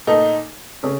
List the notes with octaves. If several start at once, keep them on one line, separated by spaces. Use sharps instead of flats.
A#2 A3 D#4 A4
C#3 A3 C#4